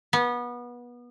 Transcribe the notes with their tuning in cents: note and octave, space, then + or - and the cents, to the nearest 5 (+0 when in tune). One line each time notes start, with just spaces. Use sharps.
B3 -25